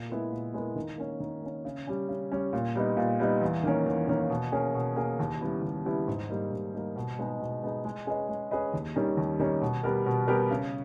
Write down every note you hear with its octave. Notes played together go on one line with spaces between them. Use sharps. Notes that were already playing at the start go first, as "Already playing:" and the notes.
Already playing: A#2
G#3 B3 E4 A#4
A#2
G#3 B3 E4 A#4
D#3
A#3 C#4
D#3
A#3 C#4
C#3
G3 C#4
C#3
G3 C#4
A#2
G3 B3 D#4
A#2
G3 B3 D#4
E2
D#3 A#3 C#4
E2
D#3 A#3 C#4
B2
A#3 C#4 G#4
B2
A#3 C#4 G#4
D#2
C#3 G3 B3 E4
D#2
C#3 G3 B3 E4
G#2
G3 A#3 D#4
G#2
G3 A#3 D#4
B2
G#3 B3 D#4 G#4
B2
G#3 B3 D#4 G#4
G#3
C#4 G#4 B4 D#5
G#3
C#4 G#4 B4 D#5
D#2
D#3 G3 C#4
D#2
D#3 G3 C#4
B2
G3 B3 G4 A#4
B2
G3 B3 G4 A#4
C#3